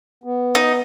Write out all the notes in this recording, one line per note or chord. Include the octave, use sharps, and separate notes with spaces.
B3
D#4